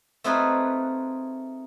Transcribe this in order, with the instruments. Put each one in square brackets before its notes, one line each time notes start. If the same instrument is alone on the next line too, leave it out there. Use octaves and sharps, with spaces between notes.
[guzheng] A3 C4 D#4 F4 G#4 B4